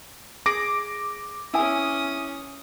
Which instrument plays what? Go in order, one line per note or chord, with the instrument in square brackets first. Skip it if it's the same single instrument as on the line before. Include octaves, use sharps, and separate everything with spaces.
[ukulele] G#4 [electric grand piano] D6 A#6 D7
[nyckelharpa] C#4 D#6 [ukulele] E4 G#5